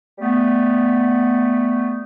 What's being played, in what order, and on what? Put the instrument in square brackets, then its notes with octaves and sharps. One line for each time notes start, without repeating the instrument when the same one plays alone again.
[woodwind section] G3 A3 B3